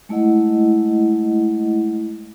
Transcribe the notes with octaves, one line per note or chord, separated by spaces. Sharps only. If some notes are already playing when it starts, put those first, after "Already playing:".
G#3 A3 E4 D#5 F#5